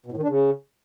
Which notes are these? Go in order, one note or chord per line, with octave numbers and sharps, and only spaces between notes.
B2
A2
D#3
D4
C#3